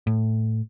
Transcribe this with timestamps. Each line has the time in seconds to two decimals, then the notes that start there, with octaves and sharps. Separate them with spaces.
0.07 A2